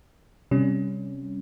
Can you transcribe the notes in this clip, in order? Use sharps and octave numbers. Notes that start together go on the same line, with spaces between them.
C3 G3 C#4